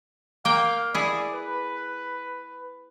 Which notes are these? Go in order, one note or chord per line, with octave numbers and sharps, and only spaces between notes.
A#3 F5 G5
E4 G#4 D5
B4